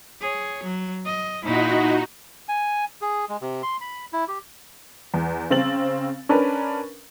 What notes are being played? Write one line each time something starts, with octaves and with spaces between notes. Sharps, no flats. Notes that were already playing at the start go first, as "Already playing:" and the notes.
G#4 C#5
F#3
D#5
A#2 D#4 E4 F#4
G#5
G#4
G#3
C3
C6
B5
E4
G4
E2
C#3 C4 A6 F#7
C#4 D4 A#4 B4